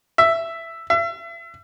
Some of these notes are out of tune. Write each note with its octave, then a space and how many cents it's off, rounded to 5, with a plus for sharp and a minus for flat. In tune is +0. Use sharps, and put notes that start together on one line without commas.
E5 +10
E5 +40